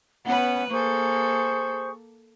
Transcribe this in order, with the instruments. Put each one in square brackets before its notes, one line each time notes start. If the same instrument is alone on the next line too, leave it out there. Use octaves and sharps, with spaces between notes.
[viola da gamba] B3 B4 [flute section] C#4 F#5
[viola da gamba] A#3 A4 [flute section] G#4 C5 C#6